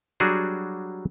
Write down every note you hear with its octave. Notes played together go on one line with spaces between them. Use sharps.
F#3 G3 D4 F#4 G#4